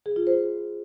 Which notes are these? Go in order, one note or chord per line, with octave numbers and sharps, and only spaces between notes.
G#4
F4
C5